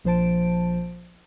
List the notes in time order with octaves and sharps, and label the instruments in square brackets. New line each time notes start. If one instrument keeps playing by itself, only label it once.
[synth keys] A#1 F3 C5 A5 D7